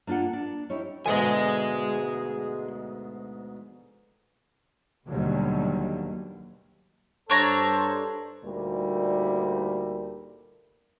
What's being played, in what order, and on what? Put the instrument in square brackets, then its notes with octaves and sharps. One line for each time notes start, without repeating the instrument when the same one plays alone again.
[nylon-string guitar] A#3 D4 F4 A4 F#5
D4
C#4 D#4 E4 G4
[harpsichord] D2 G#2 B2 [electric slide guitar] G#4 D#5 G#5
[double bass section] D#2 B2 D3 F#3 G3
[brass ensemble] G2 A4 C5 [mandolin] D4 C#5 A#5
[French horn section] D2 A#2 G3 D#4 A#4